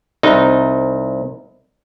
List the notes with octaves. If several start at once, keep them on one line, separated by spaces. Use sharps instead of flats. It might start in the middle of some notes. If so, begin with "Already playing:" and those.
C2 D#4